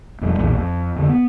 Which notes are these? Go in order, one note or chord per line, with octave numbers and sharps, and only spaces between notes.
E1 F2 G3
B1 E2 A#2
F2
F2 D3
B3